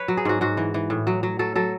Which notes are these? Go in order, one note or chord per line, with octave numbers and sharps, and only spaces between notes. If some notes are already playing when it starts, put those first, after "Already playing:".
Already playing: B4 C#5
F#3
G#4
G#2 F#4
G#2 F#4
E3
E3
A2
F#3
F#3
F#3 A4
F#3 A4